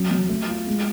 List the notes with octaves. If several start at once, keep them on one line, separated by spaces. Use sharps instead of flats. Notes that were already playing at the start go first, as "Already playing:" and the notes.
Already playing: F#3 C#4
F#3
A3
F4
G#3